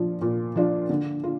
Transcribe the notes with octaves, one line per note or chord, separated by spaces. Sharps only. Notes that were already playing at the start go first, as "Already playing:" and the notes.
Already playing: A#2 F3 D4 F4
A#2
F3 D4 F4
D3
F4